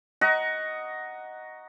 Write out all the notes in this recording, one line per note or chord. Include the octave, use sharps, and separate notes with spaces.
D#5 F#5 A#5 C#6